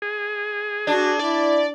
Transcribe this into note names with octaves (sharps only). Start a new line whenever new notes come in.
G#4
D4 F#4
E4 D5